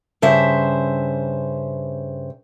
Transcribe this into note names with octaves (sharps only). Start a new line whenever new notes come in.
G2 C#3 C5 E5